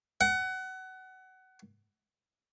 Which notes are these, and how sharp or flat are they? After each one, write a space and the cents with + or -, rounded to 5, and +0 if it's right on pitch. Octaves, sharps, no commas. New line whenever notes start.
F#5 +25